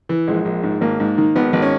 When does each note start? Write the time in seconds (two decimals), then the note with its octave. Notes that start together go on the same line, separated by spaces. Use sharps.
0.09 E3
0.28 A#1 G#3
0.45 A#1
0.63 G#2
0.81 G#1 A#3
1.00 G#2
1.18 D#3
1.36 G#1 B3
1.53 G#1
1.62 C#4